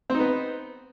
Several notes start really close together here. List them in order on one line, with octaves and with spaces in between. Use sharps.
C4 D#4 B3